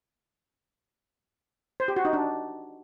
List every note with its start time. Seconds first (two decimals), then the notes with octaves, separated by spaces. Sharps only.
1.80 C5
1.88 G4
1.96 F#4
2.05 D#4
2.13 D4